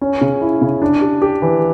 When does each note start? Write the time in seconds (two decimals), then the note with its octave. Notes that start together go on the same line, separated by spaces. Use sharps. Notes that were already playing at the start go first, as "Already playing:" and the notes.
0.01 C#4
0.21 C#3
0.41 E4
0.62 C#3
0.82 D4
1.01 G4
1.22 G4
1.42 E3